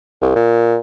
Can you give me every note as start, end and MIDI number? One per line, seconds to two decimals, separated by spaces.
0.22 0.33 36
0.35 0.77 46